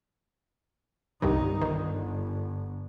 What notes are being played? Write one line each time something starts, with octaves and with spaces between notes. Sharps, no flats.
G1 C2 G2 D#3 D#4
G1 D#3